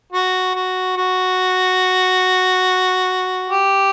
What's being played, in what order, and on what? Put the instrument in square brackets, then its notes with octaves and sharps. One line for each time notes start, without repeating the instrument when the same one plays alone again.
[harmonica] F#4
F#4
F#4
G4